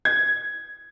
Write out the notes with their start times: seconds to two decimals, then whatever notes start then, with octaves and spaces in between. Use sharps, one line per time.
0.05 G#6